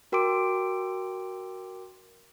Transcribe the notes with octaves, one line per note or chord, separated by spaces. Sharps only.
F#4 A#4 G5 C6 D6 D7